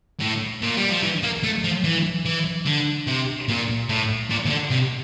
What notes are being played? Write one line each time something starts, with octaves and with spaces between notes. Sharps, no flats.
A2
A#2
G3
F3
E3
A#3
A3
F3
E3
E3
D3
C3
A#2
A2
A#2
E3
D3
C3